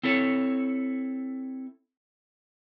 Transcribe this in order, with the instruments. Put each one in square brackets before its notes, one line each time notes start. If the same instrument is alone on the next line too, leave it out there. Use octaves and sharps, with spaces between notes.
[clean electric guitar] C4 E4 A4 C#5